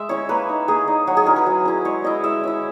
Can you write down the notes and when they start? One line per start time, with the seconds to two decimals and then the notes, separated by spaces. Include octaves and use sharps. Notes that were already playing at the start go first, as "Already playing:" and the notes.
Already playing: G#3 E5
0.09 C#4 E4 C#5
0.29 A#3 B4
0.49 D#4
0.68 A#3 G#4
0.88 D#4
1.07 F#3 F#4
1.17 G#4
1.26 C#4 E4 A#4
1.36 B4
1.46 F#3
1.65 C#4 E4
1.85 G#3 C#5
2.04 C#4 E4 D#5
2.24 G#3 E5
2.44 C#4 E4